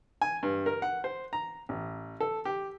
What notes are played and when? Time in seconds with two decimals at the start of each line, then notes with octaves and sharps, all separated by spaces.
0.21 G#5
0.43 G2
0.66 A#4
0.82 F#5
1.04 C5
1.33 A#5
1.69 A1
2.21 A4
2.45 G4